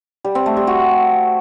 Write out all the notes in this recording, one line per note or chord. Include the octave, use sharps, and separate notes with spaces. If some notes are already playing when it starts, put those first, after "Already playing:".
G3
C4
A3
G3
F#4